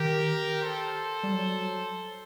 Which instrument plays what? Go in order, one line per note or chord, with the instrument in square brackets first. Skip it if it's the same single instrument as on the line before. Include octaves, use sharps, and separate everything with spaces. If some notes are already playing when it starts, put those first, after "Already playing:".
Already playing: [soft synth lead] D#3 [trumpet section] G4 A#4
[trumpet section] A4 C5
[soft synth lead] G3
F#3